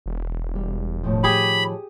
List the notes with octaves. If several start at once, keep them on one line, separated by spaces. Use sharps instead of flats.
E1
G3
A2 D#3 F3
G4 G#4 B5